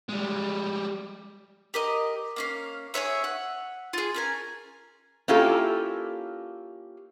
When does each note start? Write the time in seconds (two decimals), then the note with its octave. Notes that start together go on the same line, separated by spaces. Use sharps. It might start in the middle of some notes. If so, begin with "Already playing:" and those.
0.09 G3 G#3
1.74 G4 A#4 D#5
2.36 A#3 C#4 F5
2.94 G#4 C5 C#5 E5
3.24 F#5
3.93 F4 G#4
4.14 C#4 A#4 G#5
5.28 A#3 C#4 E4 F4 G4 A4